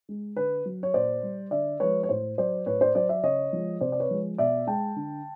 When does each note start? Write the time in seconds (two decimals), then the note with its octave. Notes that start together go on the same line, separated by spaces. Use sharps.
0.09 G#3
0.36 D3 B4
0.65 F#3
0.83 C#5
0.94 A#2 C5 D5
1.23 G3
1.51 D3 D5 E5
1.80 F3 G#3 B4 C#5
2.03 C#5
2.09 A2 C5
2.38 F#3 C5 D5
2.66 A2 B4 C#5
2.81 C5 D5
2.95 F#3 C5 D5
3.09 D5 E5
3.23 C#3 C#5 D#5
3.53 F3 G#3
3.81 C3 C5 D5
3.92 D5
4.00 B4 C#5
4.11 F3 G#3
4.38 B2 D5 E5
4.67 G#3 G5 A5
4.96 D3